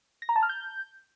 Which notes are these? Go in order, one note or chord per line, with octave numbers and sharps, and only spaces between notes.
A#6
A#5
A5
F6
G6